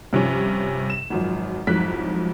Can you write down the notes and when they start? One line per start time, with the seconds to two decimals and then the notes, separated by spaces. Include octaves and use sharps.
0.13 G2 C3 F3 C#4
0.90 E7
1.10 G#1 F#2 F3
1.67 C2 F2 G#2 F#3 F#6 B6